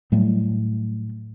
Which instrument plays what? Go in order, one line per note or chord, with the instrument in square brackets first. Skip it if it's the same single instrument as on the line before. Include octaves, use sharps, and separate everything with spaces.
[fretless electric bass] A2 F#3 G3 A3